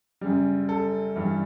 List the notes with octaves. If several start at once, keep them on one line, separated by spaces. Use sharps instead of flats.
F#2 C#3 G3
A4
G2 E3 G3